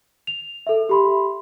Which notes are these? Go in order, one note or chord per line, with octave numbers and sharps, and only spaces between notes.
F7
A4 E5
G4 B5 C6